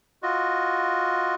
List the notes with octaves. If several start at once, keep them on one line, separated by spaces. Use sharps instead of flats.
F4 F#4 D#5